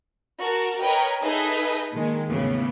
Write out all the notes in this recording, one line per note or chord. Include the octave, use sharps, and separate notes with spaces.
F#4 A#4 A5
A#4 B4 C#5 D#5 G5
D#4 G#4 A4 B4 D#5 E5
A#2 D#3 G#3
E2 A2 C#3 E3 B3